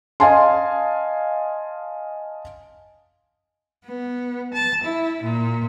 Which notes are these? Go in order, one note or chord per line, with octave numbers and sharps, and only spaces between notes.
D#5 F5 G#5 A5 C6
B3
A5
E4
A#2